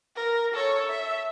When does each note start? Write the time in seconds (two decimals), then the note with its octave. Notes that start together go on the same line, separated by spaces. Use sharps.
0.16 A#4
0.54 A4 C#5
0.89 E5